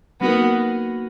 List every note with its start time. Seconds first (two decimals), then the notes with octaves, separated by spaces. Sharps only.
0.21 F#3 A#3 B3 D#4 F#4 A#4